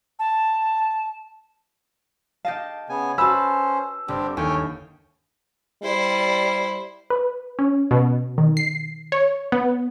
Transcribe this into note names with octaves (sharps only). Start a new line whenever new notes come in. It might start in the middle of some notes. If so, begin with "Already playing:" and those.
A5
G4 D#5 F5 A5
C#3 B3 G#5
C#4 F#4 B4 C5 A5 B5 E6
G1 C4 D4 G4
D#2 E4 A4 C#5 G5 G#5
G3 E4 C5
B4
C#4
B2
D#3
C7
C#5
B3